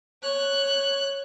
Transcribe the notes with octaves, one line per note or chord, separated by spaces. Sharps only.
C#5 F#6